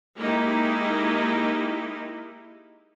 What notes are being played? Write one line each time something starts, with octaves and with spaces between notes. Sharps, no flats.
G#3 A#3 D#4 E4 G4